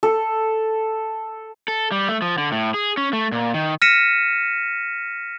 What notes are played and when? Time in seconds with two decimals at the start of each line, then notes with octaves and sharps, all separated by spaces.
0.03 A4
1.68 A4
1.92 G3
2.09 A3
2.22 F3
2.38 D3
2.52 A2
2.74 G#4
2.97 C#4
3.13 A3
3.32 A#2
3.54 D#3
3.82 F6 A#6 B6 C#7 D#7 E7